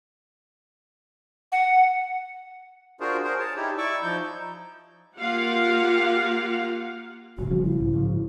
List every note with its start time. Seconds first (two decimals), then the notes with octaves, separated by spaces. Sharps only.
1.52 F#5
3.00 D4 F4 F#4 G#4 A#4 C5
3.24 G#4 A#4 C5
3.39 C#5 A5
3.57 D#4 E4 G4
3.78 E4 D5 C#6 D6 E6
4.03 F3 D#4 G6
5.18 A#3 F4 G4 F5 F#5
7.38 F1 G#2 C3 F#4
7.50 C#3 F3 G3
7.64 E4
7.80 B1 G#2 C#3
7.94 G#2 C#3 F3